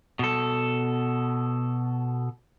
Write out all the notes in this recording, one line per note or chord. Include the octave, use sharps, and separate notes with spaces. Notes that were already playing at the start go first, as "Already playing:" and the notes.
B2 A4